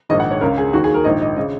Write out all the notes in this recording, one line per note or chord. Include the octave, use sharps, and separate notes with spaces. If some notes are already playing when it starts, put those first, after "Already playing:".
A#1 G#2 D#3 D#5
F#5
C#5
C#2 C#3 A#4
G#4
D#2 D#3 F#4
G#4
A#4
A#1 G#2 D#3 D#5
D#5
C#3 D#5